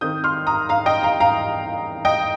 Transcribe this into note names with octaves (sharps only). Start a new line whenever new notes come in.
D#3 C4 D#6 G6
C6 F6
A#5 D#6
F5 A#5
D#5 G5
F5 A#5
F5 A#5
D#5 G5